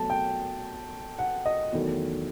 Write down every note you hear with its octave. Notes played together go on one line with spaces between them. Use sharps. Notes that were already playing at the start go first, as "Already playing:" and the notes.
Already playing: B2 F#3 A3 A5
G5
F#5
D#5
E2 D#3 F#3 A3